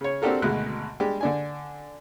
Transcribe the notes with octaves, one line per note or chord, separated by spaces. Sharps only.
C#3 C#5
C4 D4 F#4 G4 A4 A#4
G#1 D2 B2 G#3 F#6
G3 G#3 D4 G4
D3 D4 G#5